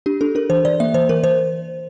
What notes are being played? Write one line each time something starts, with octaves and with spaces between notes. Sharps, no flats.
D4 G4
D4 A4
D4 A#4
E3 C5
E3 D5
A#3 E5
E3 C5
E3 A#4
E3 C5